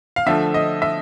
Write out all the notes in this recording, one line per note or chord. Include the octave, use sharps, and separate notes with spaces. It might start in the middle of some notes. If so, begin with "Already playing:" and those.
F5
D3 F3 A3 E5
D#5
E5